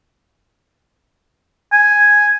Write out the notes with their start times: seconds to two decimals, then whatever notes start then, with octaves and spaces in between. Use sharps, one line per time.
1.72 G#5